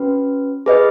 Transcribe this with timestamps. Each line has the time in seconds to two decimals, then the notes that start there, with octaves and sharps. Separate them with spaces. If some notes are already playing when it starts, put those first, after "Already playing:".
Already playing: C#4 F#4 B4
0.66 G#4 B4 D#5